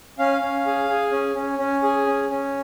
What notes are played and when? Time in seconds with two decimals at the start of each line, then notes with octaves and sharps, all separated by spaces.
0.19 C#4 F5
0.42 C#4
0.66 G#4
0.89 G#4
1.12 C#4
1.35 C#4
1.59 C#4
1.82 G#4
2.06 C#4
2.30 C#4